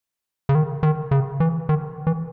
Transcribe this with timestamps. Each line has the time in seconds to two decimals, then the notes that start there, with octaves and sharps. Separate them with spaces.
0.49 C#3
0.55 D#3
0.83 D#3
1.11 C#3
1.40 E3
1.69 D#3
2.07 E3